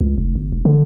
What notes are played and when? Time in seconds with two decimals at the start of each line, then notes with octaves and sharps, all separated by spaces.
0.01 C#2
0.18 F1
0.35 G1
0.52 E1
0.65 D3